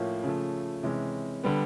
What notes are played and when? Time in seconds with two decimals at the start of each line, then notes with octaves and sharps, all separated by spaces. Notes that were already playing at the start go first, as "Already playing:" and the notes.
Already playing: A2 F3 A#3 C#4
0.24 C#3 F3 A3
0.83 C3 E3 G#3 C#4
1.44 D3 G3 B3